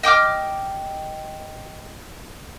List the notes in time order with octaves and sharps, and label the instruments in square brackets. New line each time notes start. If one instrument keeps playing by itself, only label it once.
[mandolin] D#5 G5 D6 F6